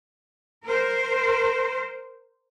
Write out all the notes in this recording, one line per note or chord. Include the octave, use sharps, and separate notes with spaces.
A#4 C5